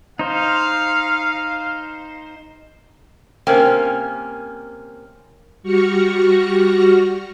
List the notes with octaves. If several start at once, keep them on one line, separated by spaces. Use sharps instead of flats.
D#4 C5 F5
C3 A#3 C#4 A#4 C5 G5
G3 F#4 C#6 F6 A#6 C#7